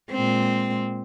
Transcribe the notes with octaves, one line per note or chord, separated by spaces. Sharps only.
A#2 G#3 C4